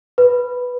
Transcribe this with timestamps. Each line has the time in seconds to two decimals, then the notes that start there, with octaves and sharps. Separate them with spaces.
0.18 B4